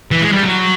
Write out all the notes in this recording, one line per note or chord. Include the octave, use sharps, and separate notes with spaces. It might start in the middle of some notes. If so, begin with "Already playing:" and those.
E3
G#3
G3
F#3